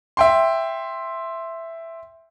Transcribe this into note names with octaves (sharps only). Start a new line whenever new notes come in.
E5 G5 C6